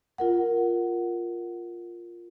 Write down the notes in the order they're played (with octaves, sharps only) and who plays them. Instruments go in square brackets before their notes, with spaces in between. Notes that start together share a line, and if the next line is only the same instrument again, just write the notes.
[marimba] F4 A#4 F#5